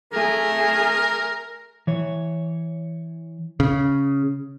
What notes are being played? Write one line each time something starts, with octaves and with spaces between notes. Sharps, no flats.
A3 G#4 A#4
E3 C#5
C#3